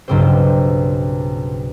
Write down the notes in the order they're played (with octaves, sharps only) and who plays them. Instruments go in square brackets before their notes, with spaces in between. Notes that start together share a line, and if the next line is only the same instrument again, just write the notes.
[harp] B1 G2 C#3 C4 G4 C5